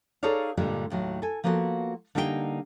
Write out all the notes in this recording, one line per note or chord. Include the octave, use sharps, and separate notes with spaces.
D#4 G#4 A4 C#5 D5 F5
G2 A#2 D3 G3 G#3
D#2 A2 F#3
A4 G#5
F3 A#3 B3 F#4 G#4 A4
D3 G3 A#3 D#4 E4 G5